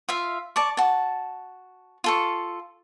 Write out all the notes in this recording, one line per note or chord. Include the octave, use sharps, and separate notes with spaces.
F4 E5 F5
D5 A5 C#6
F#4 A5
F4 A4 C#6